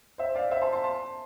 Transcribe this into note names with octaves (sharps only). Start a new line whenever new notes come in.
C5 E5
D5 F5
C5 E5
A5 C6
A5 C6
A5 C6